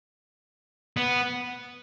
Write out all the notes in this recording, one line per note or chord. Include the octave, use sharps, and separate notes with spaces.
B3